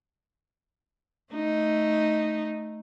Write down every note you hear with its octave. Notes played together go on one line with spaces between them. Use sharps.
A3 D#4